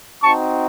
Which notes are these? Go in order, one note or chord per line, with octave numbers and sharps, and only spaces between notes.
C4 D#4 F#4 A5 C#6